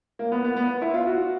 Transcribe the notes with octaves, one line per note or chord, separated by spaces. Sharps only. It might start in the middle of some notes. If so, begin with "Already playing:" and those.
A#3
B3
B3
B3
E4
F4
F#4